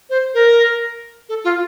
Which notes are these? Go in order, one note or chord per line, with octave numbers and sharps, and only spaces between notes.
C5
A#4
A4
F4